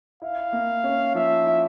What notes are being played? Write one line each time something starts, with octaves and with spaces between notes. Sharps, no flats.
E4 F5
A#3
C#4
F3 E5
E4